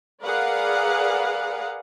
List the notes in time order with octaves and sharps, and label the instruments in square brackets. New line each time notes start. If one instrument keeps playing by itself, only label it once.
[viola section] G#4 A#4 B4 D5 F5 F#5